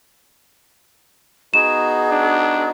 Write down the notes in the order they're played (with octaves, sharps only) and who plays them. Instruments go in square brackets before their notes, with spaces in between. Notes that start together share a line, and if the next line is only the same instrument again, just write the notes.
[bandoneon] B3 D#4 F#4 [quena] G#4 [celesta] E7
[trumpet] D4